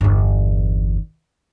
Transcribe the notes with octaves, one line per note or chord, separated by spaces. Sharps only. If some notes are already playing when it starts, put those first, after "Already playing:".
G1 E2